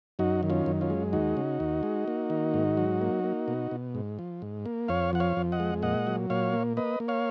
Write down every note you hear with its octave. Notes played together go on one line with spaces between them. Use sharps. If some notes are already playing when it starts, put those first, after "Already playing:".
F#2 D#4 F#4
D#3
C#4 F4
F#2
C#4 F4
G#3
D#2 D#4 F#4
C#3
D#2
G#3
A#3
D#3
G#2
F#3
A#3
A#3
B2
B2
G#2
F3
G#2
A#3
F2 C#5 F5
F3 F#5
C#5 F5
F2
D#5 F#5
G#3
A#2 D#5 F#5
F#3
A#2 C#5 F5
A#3
A#3 B4 D#5
A#3
C#5 F5